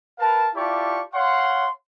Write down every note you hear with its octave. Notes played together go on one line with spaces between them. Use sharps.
A#4 B4 F5 A5
E4 F4 G4 D5 A5 C#6
C#5 F5 F#5 C6